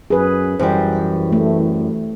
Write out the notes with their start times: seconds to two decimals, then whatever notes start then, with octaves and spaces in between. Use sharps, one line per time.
0.10 F#2 G#4 B4
0.60 F#2 E3 G3 C5
1.32 A3